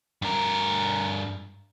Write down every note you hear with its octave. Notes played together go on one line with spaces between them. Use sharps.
G2 A#4